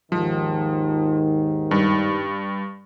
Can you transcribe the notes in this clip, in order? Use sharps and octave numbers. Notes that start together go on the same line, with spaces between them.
D#2 G#2 D#3 F3
G2